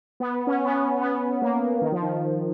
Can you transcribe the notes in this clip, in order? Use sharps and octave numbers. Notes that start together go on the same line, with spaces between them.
B3
C#4
B3
C#4
C#4
B3
A#3
D#3
F3
D#3